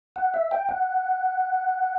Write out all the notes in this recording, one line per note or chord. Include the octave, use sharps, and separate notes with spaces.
F#5
E5
G5
F#5